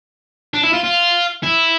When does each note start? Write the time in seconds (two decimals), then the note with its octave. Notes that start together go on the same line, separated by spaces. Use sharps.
0.54 D4
0.63 E4
0.73 F4
0.83 F4
1.43 E4